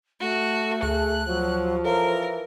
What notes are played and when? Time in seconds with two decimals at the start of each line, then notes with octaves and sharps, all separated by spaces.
0.21 A3 F#4
0.83 D2 G#4 A5 F#6
1.28 F3 F#3
1.85 E3 A4 A#4 C#5 F5